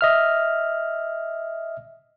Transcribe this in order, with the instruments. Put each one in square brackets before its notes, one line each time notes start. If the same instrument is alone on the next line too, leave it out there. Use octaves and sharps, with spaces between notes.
[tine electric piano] D#5 E5 F6